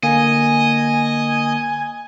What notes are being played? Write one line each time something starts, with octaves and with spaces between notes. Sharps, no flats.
D3 A#3 D#5 G#5